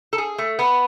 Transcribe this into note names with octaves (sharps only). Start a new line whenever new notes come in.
A4
G#4
A3
B3